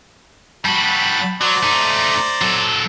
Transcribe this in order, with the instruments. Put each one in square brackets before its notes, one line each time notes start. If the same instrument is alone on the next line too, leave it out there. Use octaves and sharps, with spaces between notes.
[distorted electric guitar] G3 F#4 [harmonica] A5 B5
[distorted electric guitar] F#3 [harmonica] C5 D5 A#5
[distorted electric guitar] A3 D#4
F#3 A4